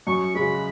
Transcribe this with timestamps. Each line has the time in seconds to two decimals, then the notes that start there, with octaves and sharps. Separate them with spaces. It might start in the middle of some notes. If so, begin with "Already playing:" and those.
0.07 F#2 C#6
0.35 C#3 G#3 B5
0.52 F#4